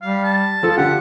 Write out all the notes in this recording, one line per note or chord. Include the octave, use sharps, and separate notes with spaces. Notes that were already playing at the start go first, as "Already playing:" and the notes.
G3 F5
A5
F3 F4 A4
D3 G4 F#5